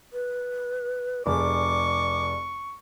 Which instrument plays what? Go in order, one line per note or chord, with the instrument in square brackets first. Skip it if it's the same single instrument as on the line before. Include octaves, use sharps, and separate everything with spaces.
[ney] B4
[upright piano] F1 G#4 [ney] D5 [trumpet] C#6 [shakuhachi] D6